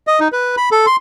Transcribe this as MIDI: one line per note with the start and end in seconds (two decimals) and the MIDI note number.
0.07 0.20 75
0.20 0.28 63
0.32 0.56 71
0.57 0.69 83
0.72 0.86 69
0.86 0.96 84